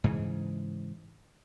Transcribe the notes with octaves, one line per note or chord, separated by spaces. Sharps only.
G#2 C#3 E3